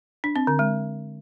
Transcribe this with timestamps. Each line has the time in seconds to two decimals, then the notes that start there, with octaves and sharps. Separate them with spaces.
0.24 D4
0.36 C4
0.47 D3
0.59 G#3